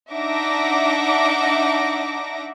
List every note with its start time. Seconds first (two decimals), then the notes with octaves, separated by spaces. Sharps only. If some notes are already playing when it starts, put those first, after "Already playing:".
0.13 D4 D#4 E5 F#5 D6 A#6